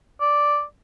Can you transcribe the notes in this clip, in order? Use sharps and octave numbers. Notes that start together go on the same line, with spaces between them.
D5